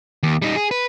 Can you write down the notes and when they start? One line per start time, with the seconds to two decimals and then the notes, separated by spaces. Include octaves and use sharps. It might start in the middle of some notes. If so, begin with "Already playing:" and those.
0.23 D#2
0.42 G3 D#4
0.56 G#4
0.71 B4